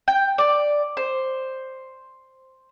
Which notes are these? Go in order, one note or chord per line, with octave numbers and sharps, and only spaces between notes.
G5
D5
C5